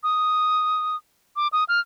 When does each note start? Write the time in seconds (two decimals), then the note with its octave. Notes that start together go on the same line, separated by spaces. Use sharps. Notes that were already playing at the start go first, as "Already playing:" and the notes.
0.03 D#6
1.36 D6
1.53 D#6
1.69 F6